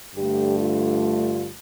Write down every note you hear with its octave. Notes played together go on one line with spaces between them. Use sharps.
G2 D3 A3 G4
F4